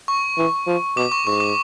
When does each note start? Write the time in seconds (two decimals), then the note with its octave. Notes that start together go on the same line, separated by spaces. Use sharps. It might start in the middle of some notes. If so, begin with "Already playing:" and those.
0.08 C#6
0.38 E3
0.67 F3
0.97 B2 D6
1.12 C#6
1.26 G#2 C#6
1.40 D6